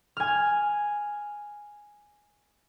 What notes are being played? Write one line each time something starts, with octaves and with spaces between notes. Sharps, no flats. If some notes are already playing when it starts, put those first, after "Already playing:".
G#5 F6